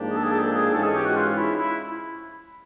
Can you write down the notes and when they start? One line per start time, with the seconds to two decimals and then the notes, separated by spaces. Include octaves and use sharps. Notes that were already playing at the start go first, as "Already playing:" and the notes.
Already playing: G#2 F3 A#3 D4 G4
0.08 G#4
0.17 A4
0.23 G#4
0.31 A4
0.38 G#4
0.46 A4
0.53 G#4
0.72 G#2 E3 G#3 C#4 A4
0.83 G#4
0.94 G4
1.05 F#4
1.16 F4
1.37 E4
1.58 E4